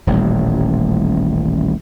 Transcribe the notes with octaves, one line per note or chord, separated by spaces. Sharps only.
D#1 A1 A#2 G3